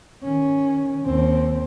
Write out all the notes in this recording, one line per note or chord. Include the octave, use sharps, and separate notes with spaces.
D#3 C#4
D#2 C4